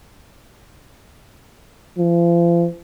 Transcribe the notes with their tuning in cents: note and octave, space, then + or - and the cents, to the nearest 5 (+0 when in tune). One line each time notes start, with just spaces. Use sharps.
F3 -40